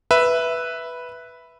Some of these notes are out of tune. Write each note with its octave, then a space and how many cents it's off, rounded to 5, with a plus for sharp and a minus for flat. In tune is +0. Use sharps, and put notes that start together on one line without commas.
B4 +0 E5 +0